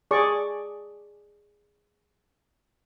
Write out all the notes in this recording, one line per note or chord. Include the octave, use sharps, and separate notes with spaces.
G#4 D5 C#6